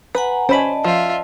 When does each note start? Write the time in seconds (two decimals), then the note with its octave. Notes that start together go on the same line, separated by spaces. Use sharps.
0.15 B4 F#5 G#5 A#5
0.49 C#4 C5 D5 D#5 A5 B5
0.84 F3 F4 E5